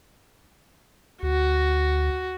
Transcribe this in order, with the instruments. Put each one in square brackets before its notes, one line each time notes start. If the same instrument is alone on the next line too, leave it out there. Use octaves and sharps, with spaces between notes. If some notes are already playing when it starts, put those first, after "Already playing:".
[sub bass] D2 [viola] F#4